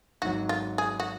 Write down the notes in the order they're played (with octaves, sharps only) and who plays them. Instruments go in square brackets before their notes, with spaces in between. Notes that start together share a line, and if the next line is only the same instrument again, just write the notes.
[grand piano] G#1 G#2 F#3 [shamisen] F#4
[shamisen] F4
G#4
F#4